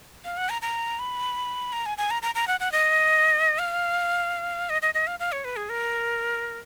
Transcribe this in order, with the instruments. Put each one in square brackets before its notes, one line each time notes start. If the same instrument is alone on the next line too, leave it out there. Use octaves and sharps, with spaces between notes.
[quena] F5
F#5
A#5
A#5
B5
A#5
G#5
G#5
A#5
A#5
A#5
F#5
F#5
D#5
F5
D#5
D#5
D#5
F5
F5
C#5
B4
G#4
A#4